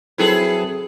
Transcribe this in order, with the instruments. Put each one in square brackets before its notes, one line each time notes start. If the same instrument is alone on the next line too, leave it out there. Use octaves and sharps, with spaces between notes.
[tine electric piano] F#3 C4 B4 [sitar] E4 G#4 A4